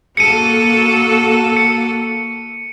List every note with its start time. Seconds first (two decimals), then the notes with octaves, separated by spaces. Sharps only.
0.17 A#3 F#4 A4 C#7 D#7
1.57 C#7